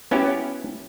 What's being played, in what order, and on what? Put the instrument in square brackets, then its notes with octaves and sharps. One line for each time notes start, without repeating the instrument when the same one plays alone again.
[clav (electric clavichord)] B3 C#4 E4 F#4 G4